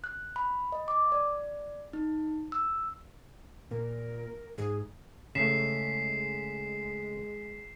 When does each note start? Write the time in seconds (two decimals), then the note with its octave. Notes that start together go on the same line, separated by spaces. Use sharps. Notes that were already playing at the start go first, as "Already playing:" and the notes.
0.04 F#6
0.36 B5
0.72 D#5
0.88 D6
1.12 D5
1.93 D#4
2.52 E6
3.71 A#2 A#4
4.58 G#2 G#4
5.35 C#3 G#3 A3 B6 C7 E7